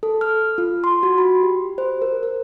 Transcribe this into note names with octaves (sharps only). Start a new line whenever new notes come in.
A4
F6
F4
C6
F#4
B5
G4
C5
A#4
A#4